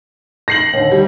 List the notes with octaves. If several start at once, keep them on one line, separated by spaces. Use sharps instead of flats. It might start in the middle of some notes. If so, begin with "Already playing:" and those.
A#6 C7 F#7
D#2 D3
G3